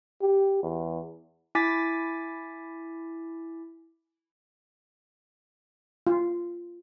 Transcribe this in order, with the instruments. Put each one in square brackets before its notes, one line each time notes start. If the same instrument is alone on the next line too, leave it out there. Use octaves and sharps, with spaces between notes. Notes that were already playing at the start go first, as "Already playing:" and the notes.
[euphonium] G4
E2
[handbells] E4 G#5 D6 A6 B6
[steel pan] F4